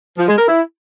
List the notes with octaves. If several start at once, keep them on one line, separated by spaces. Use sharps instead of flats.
F3
G#3
A#4
E4